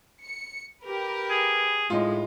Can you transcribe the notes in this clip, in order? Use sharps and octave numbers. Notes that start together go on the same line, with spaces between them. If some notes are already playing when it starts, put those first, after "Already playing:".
C#7
G4 A#4 B4
G#4
A2 G#3 D#4 F4